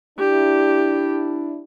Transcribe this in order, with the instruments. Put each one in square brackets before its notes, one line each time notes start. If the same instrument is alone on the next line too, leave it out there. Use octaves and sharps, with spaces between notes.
[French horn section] D4 E4 [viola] G4